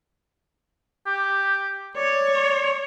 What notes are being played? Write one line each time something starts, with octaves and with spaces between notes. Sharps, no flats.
G4
C#5 D5